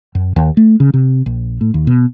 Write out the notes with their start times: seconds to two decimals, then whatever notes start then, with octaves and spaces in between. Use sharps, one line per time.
0.15 F#2
0.36 D#2
0.57 A3
0.80 C#3
0.94 C3
1.26 A#1
1.61 A2
1.74 D#2
1.87 B2